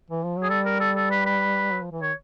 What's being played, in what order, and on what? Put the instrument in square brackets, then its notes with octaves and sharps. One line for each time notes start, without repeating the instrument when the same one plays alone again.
[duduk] E3
F3
F#3
[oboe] G#4
[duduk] G3 [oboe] A4
[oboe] A#4
A4
A4
B4
B4
[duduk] F#3
F3
E3
[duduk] D#3 [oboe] C#5